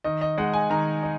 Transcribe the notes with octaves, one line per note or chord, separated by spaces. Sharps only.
D#3 D#5
D#5
G#3 D#4 F#5
G#5
D#3 A#5
D#4